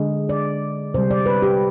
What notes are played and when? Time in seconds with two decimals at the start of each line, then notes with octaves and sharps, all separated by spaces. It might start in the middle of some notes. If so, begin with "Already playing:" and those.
Already playing: D3 G#3
0.29 D5
0.94 C3 C5
0.97 G3
1.11 D5
1.26 B4
1.42 G4